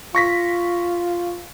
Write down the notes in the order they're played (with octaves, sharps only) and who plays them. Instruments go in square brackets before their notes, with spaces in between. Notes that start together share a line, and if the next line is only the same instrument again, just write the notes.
[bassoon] F4 [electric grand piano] C#6 A#6 B6